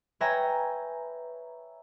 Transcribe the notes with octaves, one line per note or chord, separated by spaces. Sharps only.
B4 C#5 E5 G5 G#5 A#5